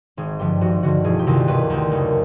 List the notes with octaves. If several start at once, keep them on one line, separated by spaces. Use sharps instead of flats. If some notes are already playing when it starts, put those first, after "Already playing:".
G#1 G#4
G2 D3 F3 G4
G#1 F#4
G2 D3 F3 F#4
E1 G#4
G4
D2 C3 D#3
F4
E1 B4
D2 C3 D#3
F#1